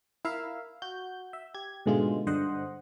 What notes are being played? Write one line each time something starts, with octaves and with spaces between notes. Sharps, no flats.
E4 A#4 E5 F5
F#4 G6
E5
G4 G#6
G#2 B2 D3 G#3 A3 F4
G2 D3 C5 D#5 F#5